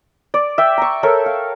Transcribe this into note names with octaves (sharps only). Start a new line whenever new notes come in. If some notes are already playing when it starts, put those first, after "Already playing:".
D5
E5 G5
A#5 C#6
A4 A#4 C#5 E5
F5